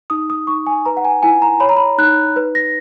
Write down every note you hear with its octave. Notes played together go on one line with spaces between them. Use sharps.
D#4 D#6
D#6
D#4 C#6
G#5
B4 A#5
F#5
G#5
E4 G#5
A#5
C#5 B5
A#5
B5
D#4 F#6
B4
A#6